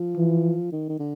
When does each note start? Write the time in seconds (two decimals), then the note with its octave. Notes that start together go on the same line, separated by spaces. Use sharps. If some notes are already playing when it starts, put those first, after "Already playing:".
Already playing: F3
0.17 E3
0.72 D#3
0.89 D#3
0.99 D3